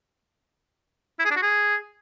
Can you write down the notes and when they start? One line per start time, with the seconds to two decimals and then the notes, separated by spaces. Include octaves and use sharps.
1.19 E4
1.25 G#4
1.31 D4
1.37 F#4
1.42 G#4